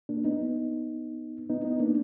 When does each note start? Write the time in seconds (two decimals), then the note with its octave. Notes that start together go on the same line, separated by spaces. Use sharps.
0.09 A#3 D4
0.24 B3 D#4
1.50 B3 D#4
1.64 B3 D#4
1.80 A#3 D4